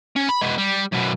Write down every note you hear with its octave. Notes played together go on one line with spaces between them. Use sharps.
C#4
B5
G#3 B3
G3
F#2 B2